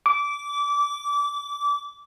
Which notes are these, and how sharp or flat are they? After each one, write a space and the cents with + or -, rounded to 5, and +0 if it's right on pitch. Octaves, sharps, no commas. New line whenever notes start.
D6 -20